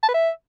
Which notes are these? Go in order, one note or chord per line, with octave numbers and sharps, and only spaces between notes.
A5
B4
E5